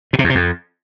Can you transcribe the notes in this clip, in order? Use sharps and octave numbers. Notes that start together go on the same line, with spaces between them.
B2
C3
E2
C3
F2